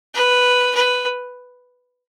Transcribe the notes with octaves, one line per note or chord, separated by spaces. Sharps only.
B4
B4